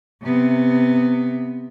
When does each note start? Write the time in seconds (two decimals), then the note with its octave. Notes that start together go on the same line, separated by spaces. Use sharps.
0.23 C3 B3